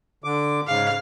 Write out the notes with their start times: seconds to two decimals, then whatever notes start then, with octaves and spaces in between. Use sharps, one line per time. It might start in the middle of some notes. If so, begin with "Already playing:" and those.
0.24 D3 D6
0.68 G#2 C#3 F5